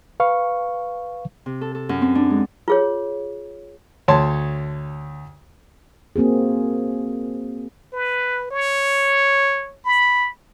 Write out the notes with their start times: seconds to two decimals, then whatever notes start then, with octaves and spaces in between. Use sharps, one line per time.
0.20 B4 F5 C#6
1.46 C3
1.61 A4
1.75 A4
1.89 F#2
2.01 C4
2.15 D4
2.30 G#3
2.68 F4 G#4 C#5
4.08 D2 C#5 A5 C6
6.16 A#3 C4 F#4 G#4
7.93 B4
8.51 C#5
9.85 B5